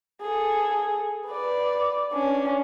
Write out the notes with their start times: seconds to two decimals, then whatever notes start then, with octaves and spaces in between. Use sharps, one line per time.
0.22 G#4 A4
1.27 B4 D5
2.13 C#4 D4